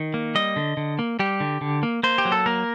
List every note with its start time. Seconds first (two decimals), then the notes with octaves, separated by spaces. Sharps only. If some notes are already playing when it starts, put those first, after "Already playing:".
Already playing: D#3
0.14 A#3
0.35 G3 D#5
0.56 D3
0.77 D3
0.99 A#3
1.19 G3 G4
1.40 D3
1.61 D3
1.83 A#3
2.03 A#3 C5
2.18 G4
2.25 F#3
2.32 A4
2.46 A#3 A#4